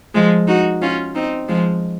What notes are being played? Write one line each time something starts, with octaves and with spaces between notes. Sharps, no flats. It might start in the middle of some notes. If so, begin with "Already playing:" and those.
F3 G#3
D#4 F#4
C#4 F4
C4 D#4
F3 G#3